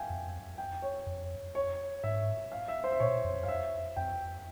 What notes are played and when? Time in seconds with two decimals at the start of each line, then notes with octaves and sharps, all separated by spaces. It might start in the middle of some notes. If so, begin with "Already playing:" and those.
Already playing: E5 F5 G5 G#5
0.10 F2
0.58 G5
0.82 C#5
1.07 F2
1.55 C#5
2.04 G#2 E5
2.52 F5
2.68 E5
2.84 C5
2.92 E5
3.00 A#2 C#5
3.24 F2
3.43 F5
3.48 E5
3.96 F2 G5